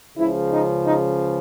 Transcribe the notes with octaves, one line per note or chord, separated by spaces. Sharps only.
C#2 C#3 F3 E4
D#4
D#4